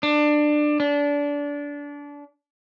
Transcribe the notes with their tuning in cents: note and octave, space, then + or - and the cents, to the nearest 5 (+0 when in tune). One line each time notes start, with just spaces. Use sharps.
D4 +20
D4 -25